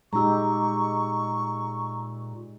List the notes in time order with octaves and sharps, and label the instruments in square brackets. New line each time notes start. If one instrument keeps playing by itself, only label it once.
[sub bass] A#2 [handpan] G#3 D#4 G4 [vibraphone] A#5 E6 [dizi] C#6